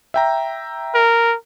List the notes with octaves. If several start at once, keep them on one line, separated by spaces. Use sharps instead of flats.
E5 G5 A#5
A#4